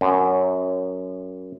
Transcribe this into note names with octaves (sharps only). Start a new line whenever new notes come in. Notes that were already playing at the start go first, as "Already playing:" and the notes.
F#2